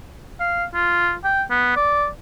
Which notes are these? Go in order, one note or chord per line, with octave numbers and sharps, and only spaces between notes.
F5
F4
G5
B3
D5